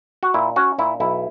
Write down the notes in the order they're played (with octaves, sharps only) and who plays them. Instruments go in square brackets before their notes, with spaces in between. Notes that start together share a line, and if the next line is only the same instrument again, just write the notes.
[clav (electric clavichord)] F#4
A#2 E4
C#4 F#4
A#2 E4
B1 E4